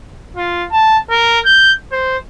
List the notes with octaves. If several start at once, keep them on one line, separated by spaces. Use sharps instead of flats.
F4
A5
A#4
G6
C5